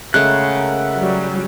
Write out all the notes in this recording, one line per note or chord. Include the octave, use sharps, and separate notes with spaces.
C#3 G#3 A3 A#4 E5 F#5 F#6
F#3 G3